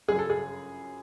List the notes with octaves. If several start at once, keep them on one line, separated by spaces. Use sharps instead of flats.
G1 F#2 C#3 G#4
A4
G#4